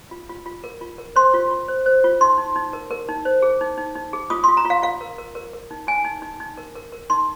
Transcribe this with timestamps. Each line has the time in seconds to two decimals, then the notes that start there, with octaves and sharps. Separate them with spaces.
0.11 F4
0.29 F4
0.46 F4
0.64 A#4
0.81 F4
0.98 A#4
1.16 C5 C6
1.34 F4
1.51 F4
1.68 C5
1.86 C5
2.04 F4
2.21 D#4 C6
2.38 D#4
2.56 D#4
2.73 A#4
2.91 A#4
3.08 D#4
3.25 C5
3.42 G#4
3.61 D#4
3.78 D#4
3.95 D#4
4.13 G#4
4.30 F4 D#6
4.44 C6
4.48 F4
4.57 A#5
4.65 F4
4.70 F5
4.82 F4 F5
5.01 A#4
5.18 A#4
5.35 A#4
5.53 A#4
5.71 D#4
5.87 D#4 G#5
6.05 D#4
6.22 D#4
6.40 D#4
6.57 A#4
6.75 A#4
6.92 A#4
7.10 D#4 C6